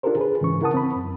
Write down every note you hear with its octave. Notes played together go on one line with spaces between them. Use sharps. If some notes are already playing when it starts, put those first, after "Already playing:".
D4 F4 G4 A4 A#4 C5
G#4 B4
G#2 C#3 E3 C#4 C#6
E4 A#4 F#5 A5 D#6
C4 B5
F#2